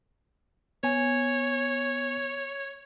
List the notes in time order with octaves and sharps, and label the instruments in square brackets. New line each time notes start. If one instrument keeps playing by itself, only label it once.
[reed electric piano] B3 G#5 [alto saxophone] C#5